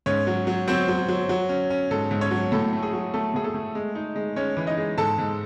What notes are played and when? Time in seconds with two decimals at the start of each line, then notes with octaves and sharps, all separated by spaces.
0.06 G#2 C#4 C#5
0.27 F#3
0.47 F#3
0.68 F#3 C4 C5
0.88 F#3
1.08 F#3
1.29 F#3
1.49 C#4
1.70 C#4
1.91 G#2 A4
2.11 G#2
2.21 C#4 C#5
2.31 F#3
2.52 A2 A4
2.73 A3
2.83 G#4
2.93 F#3
3.14 A3 A4
3.34 A2 G#4
3.44 A4
3.54 A3
3.75 G#3
3.95 D#4
4.16 G#3
4.36 G#3 C#4 C#5
4.57 E3
4.67 D#4 D#5
4.77 G#3
4.98 G#2 A4 A5
5.18 G#2